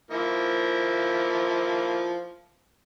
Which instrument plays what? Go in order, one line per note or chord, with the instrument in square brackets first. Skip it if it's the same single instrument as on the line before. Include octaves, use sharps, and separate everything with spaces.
[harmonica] F3 A#3 E4